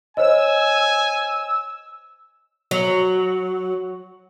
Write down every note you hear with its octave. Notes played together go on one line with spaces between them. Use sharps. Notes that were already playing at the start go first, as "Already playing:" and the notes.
C5 C#5 D#5 G#5 E6
F#3